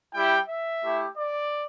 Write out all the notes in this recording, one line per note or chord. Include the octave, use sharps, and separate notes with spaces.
G3 E4 G4 G5
E5
A3 E4 G4
D5